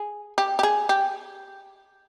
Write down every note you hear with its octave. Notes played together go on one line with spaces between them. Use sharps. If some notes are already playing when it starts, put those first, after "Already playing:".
Already playing: G#4
G4
G4
G#4
G4